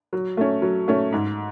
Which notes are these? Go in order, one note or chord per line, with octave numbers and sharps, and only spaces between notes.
F#3
A3 C#4
F#3
A3 C#4
G#2